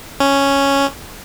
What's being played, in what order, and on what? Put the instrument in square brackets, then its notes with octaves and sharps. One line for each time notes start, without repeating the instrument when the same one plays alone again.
[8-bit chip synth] C#4